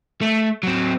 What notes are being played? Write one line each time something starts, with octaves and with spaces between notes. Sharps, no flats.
A3
F#3 C4